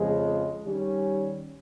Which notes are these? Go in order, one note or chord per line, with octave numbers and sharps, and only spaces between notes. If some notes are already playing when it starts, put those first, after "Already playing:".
Already playing: F2 C#3 F3 G#3
D#3 G3 C#4